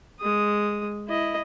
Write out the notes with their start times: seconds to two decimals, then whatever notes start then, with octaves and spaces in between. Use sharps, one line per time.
0.20 G#3 D#6
1.08 E4 D#5